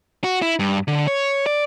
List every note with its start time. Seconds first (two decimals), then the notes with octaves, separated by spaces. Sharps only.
0.24 F#4
0.42 E4
0.59 G2
0.88 D3
1.07 C#5
1.46 D5